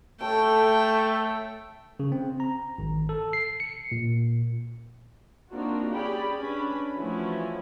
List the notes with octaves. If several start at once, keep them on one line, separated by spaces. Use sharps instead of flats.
A3 A4 C#5 G5 A5
C#3
C4
A#5
G#1
A4
C7
C#7
A#2
A#3 C4 D4 D#4 F4 F#4
C#4 G4 G#4 D5 G5 B5
C#4 D4 B4 B5
E3 F3 A3 C#4 E4 F#4